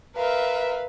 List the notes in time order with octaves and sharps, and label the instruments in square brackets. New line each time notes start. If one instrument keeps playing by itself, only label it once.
[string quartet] A#4 E5 [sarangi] B4 [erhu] F5